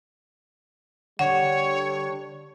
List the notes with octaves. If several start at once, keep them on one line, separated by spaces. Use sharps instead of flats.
D3 G3 C#5 F#5